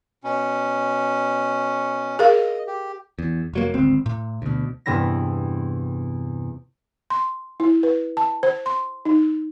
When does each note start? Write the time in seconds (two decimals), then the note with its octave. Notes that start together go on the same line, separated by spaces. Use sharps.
0.24 B2 C#4
2.19 G#4 A#4 D#5 F5
2.67 G4
3.19 E2
3.53 F1 F#3 A#3
3.74 G#1 D2 C4
4.06 A2
4.42 D2 B2
4.86 E2 G2 C3 B3 E4 A#6
7.10 C6
7.60 E4
7.83 B4
8.17 A5
8.43 C5
8.66 C6
9.05 D#4